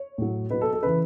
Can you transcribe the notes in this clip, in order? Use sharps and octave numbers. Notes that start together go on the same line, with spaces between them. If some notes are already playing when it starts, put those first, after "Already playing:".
Already playing: C#5
A2 F#3
B2 F#3 B4
A4
A4
C#3 E3 B4